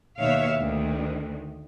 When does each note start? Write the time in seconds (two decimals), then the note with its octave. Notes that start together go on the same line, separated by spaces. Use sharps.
0.18 D#2 B2 C#5 E5 F5
0.58 D2 D#3